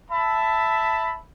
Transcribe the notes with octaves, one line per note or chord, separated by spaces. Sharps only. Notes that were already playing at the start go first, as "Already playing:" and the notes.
E5 A5 B5